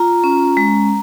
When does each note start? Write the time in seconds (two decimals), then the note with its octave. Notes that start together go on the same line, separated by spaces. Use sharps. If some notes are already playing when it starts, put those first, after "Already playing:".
Already playing: F4 A#5
0.24 C#4
0.57 G#3